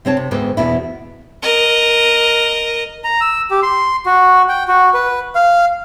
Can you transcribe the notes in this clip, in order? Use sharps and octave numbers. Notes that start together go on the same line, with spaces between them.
C3 C4 C#5 A5
C3
D2 G#2 B3 G5
E2 B2 E4
A#4 D#5
A#5
E6
G4
C6
F#4
G5
F#4
B4
F5